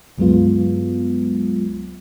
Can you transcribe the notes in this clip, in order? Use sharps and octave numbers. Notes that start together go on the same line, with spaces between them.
C#2 G2 F#3 G#3 B3 F4